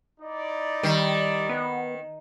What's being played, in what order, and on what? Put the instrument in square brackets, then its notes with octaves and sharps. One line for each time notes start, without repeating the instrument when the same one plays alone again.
[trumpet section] D#4 E4 D5
[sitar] D#3 [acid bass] G3
[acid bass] B3